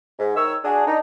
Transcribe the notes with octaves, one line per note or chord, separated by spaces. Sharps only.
G#2
D#3 C#5 E6
D4 F#4 G#4
D4 D#4